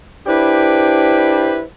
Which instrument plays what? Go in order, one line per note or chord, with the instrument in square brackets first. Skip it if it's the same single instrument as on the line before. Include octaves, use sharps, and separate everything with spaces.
[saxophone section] D4 E4 G4 B4 C5 D5